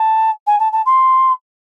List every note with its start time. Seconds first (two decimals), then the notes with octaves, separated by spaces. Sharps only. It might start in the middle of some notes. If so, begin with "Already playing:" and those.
Already playing: A5
0.46 G#5
0.59 A5
0.72 A5
0.85 C6